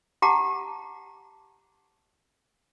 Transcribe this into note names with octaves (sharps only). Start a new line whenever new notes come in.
G4 F#5 A5 A#5 D6